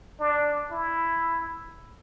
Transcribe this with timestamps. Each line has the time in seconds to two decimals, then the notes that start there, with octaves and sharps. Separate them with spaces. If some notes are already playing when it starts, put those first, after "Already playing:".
0.20 D4
0.71 E4